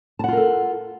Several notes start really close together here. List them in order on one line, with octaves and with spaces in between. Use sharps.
A5 F#5 F4 A#4 A4